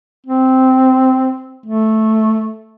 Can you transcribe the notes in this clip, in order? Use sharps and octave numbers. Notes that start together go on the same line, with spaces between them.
C4
A3